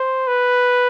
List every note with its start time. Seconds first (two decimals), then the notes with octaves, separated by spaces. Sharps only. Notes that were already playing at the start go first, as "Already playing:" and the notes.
Already playing: C5
0.27 B4